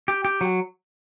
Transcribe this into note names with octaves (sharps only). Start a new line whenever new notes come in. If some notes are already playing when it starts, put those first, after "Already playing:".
G4
G4
F#3